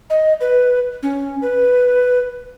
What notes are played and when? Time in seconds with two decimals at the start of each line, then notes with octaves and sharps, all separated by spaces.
0.10 D#5
0.41 B4
1.03 C#4
1.42 B4